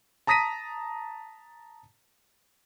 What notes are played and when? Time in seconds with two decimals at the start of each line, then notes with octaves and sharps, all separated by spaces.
0.27 A5 A#5 D#6 A#6 B6 D#7